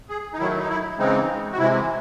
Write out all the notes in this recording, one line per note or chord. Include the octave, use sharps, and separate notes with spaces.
G#4
D#4
D#3 F#3 A3 E4
D#4
E4
C#3 E3 G#3 C4 D#4
F#4
C3 E3 G#3 E4